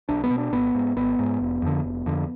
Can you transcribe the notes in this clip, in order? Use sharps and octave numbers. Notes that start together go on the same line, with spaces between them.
B1 D4
B3
B2
D4
G#1 B3
G#2
G#1 B3
G#2
F1
F2 D3
F1
F2 D3